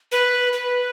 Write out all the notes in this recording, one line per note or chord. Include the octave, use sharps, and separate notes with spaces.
B4
B4